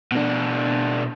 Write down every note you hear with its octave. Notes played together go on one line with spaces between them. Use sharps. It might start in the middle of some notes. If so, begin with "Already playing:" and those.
B2 D4